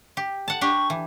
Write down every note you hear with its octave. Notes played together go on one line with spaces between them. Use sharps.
G4
F#5 A5
D4 G4 C#6
E3